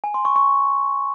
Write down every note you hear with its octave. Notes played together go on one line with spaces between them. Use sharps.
G#5
C6
C#6
C#6